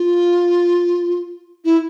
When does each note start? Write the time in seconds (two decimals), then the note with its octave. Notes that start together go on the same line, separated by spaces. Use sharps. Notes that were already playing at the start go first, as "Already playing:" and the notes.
Already playing: F4
1.65 E4